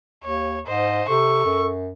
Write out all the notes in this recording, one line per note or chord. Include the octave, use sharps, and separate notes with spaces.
D#2 C#5
G#2 C5 D#5
C3 A4 C#6
F#2